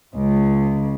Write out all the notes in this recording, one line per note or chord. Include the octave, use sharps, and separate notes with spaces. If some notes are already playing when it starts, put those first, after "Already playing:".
C#2